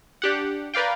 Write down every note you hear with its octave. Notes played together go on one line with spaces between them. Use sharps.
D4 G4 F#5
A#4 B4 D5 F5 G5